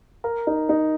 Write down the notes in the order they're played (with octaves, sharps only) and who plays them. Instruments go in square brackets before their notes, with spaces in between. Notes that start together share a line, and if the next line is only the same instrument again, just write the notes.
[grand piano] A#4
D#4
D#4